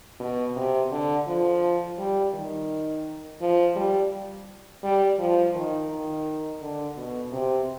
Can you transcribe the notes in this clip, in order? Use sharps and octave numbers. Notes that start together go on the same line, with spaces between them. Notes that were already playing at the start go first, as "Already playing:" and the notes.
B2
C3
D3
F3
G3
D#3
F3
G3
G3
F3
D#3
D#3
D3
B2
C3